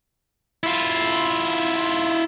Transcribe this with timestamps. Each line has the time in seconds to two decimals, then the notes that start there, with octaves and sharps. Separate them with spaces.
0.63 E4 F4